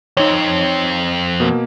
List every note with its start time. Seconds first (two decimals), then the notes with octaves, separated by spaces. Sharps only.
0.17 F2 C4 D#4 C#5
1.40 B2 A#3